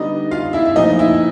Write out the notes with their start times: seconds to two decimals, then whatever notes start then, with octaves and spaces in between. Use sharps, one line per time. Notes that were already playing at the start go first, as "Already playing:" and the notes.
Already playing: D3 G3 B3 D4 D#4 D#5
0.31 F4 F5
0.53 E4 E5
0.65 E5
0.76 A#2 F3 A3 D#4 D#5
0.99 E4 E5